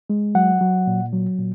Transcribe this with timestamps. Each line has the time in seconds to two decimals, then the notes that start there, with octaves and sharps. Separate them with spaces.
0.10 G#3
0.35 F#3 F#5
0.61 F#3
0.87 A#2
1.13 F#3
1.39 A#2